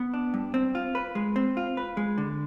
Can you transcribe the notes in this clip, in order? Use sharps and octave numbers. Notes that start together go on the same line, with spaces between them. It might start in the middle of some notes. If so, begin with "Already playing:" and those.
Already playing: B3
D4
G2
C4
F4
B4
G#3
C4
F4
B4
G#3
D3